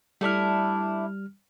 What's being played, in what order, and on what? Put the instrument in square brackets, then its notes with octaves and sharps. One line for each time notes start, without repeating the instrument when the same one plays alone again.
[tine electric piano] G3 F6 [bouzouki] A3 D4 E4